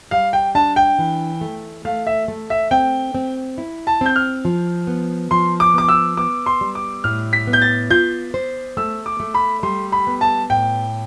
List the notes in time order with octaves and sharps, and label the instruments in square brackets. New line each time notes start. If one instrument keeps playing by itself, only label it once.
[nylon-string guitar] G3 [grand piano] F5
[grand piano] G5
[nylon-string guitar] D4 [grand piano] A5
[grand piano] G5
[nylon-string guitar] E3
A3
[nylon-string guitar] A3 [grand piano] F5
[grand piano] E5
[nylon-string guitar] A3
[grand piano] E5
[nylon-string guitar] C4 [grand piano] G5
[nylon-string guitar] C4
E4
[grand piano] A5
[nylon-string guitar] C4 [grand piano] G6
[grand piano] F6
[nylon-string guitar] F3
B3
[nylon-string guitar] F3 [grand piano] C6
[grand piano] D6
[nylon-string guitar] B3 [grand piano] D6
[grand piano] E6
[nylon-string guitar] B3 [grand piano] D6
[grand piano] C6
[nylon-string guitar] G3
[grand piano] D6
[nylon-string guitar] A2 [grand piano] F6
[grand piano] B6
[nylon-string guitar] B3
[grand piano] G6
A6
[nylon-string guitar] F4 [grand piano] G6
[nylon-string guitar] C5
[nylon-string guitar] A3 [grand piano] E6
[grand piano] D6
[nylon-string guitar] A3
[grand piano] B5
[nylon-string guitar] G3 [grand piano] C6
[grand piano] B5
[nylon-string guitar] B3
[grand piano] A5
[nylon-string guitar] A2 [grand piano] G5